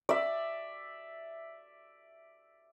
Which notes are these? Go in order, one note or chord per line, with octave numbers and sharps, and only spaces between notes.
D5 E5